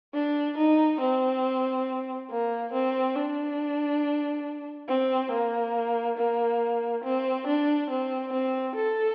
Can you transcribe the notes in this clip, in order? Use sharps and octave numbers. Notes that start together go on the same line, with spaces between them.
D4
D#4
C4
A#3
C4
D4
C4
A#3
A#3
C4
D4
C4
C4
A4